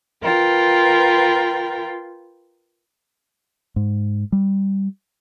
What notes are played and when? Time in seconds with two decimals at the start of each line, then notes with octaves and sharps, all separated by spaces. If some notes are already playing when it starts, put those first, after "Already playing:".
0.23 F4 A#4 B4 G5
3.76 G#2
4.32 G3